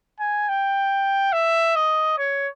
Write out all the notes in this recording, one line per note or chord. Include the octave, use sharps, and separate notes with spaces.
G#5
G5
E5
D#5
C#5